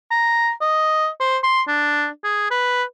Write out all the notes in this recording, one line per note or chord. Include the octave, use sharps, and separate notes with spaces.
A#5
D#5
C5
C6
D4
G#4
B4